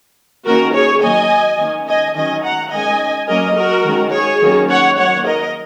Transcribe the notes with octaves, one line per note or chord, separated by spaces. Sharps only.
D#3 A#3 C#4 F#4 A#4
G#4 C#5
D#3 F#3 A#3 D#5 G#5
D#3 A#3 C#4
D#5 G#5
D#3 F#3 C#4 D#5 G#5
F#5 A#5
D#3 G#3 C#4 D#5 G#5
F#3 A#3 C#4 A#4 D#5
F#4 A#4
D#3 G#3 C#4
G#4 C#5
D#3 F#3 A#3 C#4
C#5 F#5
D#3 F#3 A#3 C#5 F#5
A#4 D#5